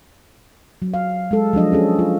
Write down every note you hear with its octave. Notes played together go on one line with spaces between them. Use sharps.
F#3
F5
G#3 A4
F3 F#3 D4 D#5
C#4 G#4 A4
F4